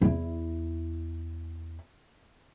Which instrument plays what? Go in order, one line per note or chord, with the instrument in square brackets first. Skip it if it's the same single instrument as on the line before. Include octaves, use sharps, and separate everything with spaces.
[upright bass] E2 E4